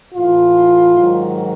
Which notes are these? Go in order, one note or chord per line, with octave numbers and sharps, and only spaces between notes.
A2 E3 F4
G#2 D#3 F#3